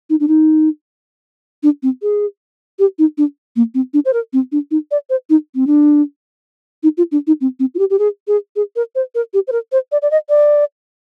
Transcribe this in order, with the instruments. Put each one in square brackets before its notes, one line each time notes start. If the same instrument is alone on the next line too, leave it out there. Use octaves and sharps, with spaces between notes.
[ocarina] D#4
D4
D#4
D4
C4
G#4
G4
D#4
D4
A#3
C4
D4
C5
A#4
C4
D4
D#4
D5
C5
D#4
C4
D4
D#4
F4
D4
D#4
C4
C4
F4
G4
G4
G#4
G#4
G#4
A#4
C5
A#4
G4
C5
A#4
C5
D5
D5
D#5
D5